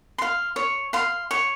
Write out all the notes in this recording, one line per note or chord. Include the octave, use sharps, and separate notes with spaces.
F5 C6
C#5
F5 C6
C#5